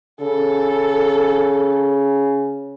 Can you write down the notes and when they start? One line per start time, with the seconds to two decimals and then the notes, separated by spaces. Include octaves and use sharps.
0.21 C#3 A4